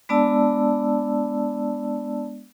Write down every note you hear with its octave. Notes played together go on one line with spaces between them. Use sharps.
G#3 B3 D4 D5 A5 E6